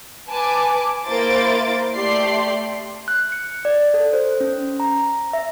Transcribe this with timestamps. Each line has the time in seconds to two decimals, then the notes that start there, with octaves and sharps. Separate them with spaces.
0.29 B4 G#5 A5 D6
1.06 A#3 E4 C5 C6 A6 D7
1.95 A3 G4 D5 C6 C7
3.08 F#6
3.32 C#7
3.65 D5
3.94 A4
4.13 C5
4.40 C#4
4.80 A#5
5.33 E5